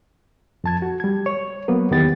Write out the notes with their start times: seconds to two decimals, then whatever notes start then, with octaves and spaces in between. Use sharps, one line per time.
0.64 F2 A5 G#6
0.82 F#4
1.00 G3 G#6
1.26 C#5
1.68 F#3 A#3 B3 B4
1.91 E2 D#3 B3 G4 G5 A6